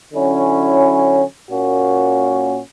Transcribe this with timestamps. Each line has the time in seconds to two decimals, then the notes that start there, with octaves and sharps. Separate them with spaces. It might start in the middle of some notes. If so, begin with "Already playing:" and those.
0.13 D3 F#3 C#4 E4
1.50 A#2 A#3 C#4 F#4